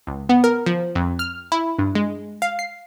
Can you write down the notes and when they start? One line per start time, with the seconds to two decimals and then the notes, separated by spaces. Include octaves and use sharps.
0.07 C#2
0.29 B3
0.44 A#4
0.66 F3
0.95 F2
1.19 F6
1.52 E4
1.79 G2
1.95 G#3
2.42 F5
2.59 C7